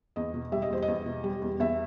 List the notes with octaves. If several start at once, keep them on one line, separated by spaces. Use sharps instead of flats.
E2 D#5
B2
G3 E5
D#5
E2 C5
D#5
E2
B2
G3
E2
E2 E5